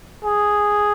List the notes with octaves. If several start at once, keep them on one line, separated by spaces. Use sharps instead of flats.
G#4